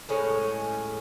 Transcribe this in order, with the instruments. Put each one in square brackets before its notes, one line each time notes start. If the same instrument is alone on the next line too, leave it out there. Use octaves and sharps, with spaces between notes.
[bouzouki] A2 G#3 C#4